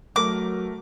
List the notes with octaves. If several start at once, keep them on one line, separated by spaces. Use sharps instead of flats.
F#3 A3 A#4 D6